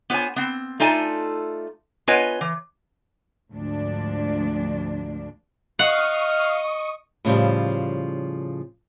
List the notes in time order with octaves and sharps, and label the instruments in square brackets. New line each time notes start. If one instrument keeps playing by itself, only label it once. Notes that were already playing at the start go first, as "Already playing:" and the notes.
[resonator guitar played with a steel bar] B3 F4 C5 C#5 G#5
B3 C4
A3 D#4 F4 D5 G#5 A5
B3 F4 B4 C#5 D#5 G#5
E3
[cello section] D2 G#2 F3 D4
[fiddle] D#5 [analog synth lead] F5 [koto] F#5 [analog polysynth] C#6 D#6
[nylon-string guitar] A2 C#3 F3 G3